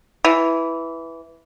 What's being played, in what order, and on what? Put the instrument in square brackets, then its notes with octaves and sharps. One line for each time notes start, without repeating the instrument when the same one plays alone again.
[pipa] E3